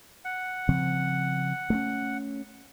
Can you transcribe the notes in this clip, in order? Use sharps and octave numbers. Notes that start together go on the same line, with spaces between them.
F#5
C#3 F3 C4
A3 B3 C#4